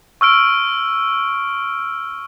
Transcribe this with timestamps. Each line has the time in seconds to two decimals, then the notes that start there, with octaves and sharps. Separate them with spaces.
0.21 C#6 E6 F6 D7